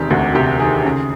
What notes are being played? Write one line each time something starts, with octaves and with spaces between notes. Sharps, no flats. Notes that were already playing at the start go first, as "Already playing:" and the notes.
Already playing: E1 C3 D#3 G4 G#4
D2 F#4
C3 G4
D#3 G#4
C#3